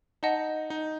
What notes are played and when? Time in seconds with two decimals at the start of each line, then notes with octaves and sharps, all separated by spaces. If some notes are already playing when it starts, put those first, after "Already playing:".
0.23 D#4 D#5 F#5 A5
0.70 D#4